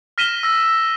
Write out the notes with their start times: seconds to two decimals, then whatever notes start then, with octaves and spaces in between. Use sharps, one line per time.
0.18 F6 A#6 B6 D#7 E7 G7
0.43 E6 A#6